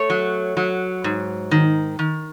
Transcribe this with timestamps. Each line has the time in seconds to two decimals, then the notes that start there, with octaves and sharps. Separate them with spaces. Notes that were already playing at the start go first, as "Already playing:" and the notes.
Already playing: A3 C#5
0.10 F#3
0.57 F#3
1.04 G#2
1.51 D#3
1.99 D#3